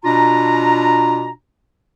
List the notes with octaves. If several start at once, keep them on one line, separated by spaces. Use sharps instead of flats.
B2 D4 F4 A#5